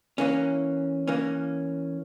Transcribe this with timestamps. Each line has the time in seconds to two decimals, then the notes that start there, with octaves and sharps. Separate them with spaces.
0.18 E3 A#3 C#4
1.08 E3 A#3 C#4